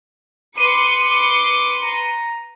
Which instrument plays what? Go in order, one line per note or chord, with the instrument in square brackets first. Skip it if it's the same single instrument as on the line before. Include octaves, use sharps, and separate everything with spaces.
[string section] B4 C6 C#7 [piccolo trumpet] D6 [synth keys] D#7
[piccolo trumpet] D6
A#5